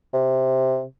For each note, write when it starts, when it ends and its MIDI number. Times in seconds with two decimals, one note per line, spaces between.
0.14 0.84 48